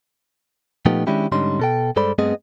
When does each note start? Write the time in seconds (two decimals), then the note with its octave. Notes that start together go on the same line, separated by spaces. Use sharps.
0.86 A#2 F3 A3 B3 D#4 G4
1.07 D#3 G#3 C#4 D4 E4 G4
1.32 G#2 D3 G3 C#4 D#4 C6
1.59 B2 A4 G5
1.96 G2 G#3 A4 C5 D5 B5
2.18 G2 A3 B3 C4 G#4 D#5